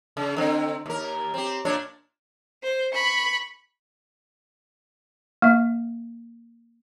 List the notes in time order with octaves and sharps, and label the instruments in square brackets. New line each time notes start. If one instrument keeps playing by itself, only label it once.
[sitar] C#3
D3 C4
D#2 A#4
C4 G4
A#2 D4 C#5
[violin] C5
B5 C#6
[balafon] A#3 E5